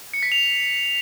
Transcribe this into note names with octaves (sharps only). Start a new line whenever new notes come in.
C#7
B6
F7